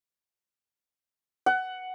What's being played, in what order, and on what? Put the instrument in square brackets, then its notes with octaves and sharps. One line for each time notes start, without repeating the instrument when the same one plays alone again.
[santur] F#5